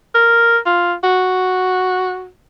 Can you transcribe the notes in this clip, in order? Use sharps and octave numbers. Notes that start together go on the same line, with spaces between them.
A#4
F4
F#4